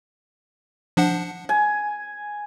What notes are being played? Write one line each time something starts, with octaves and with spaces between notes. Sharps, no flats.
F3 D4 F#5
G#5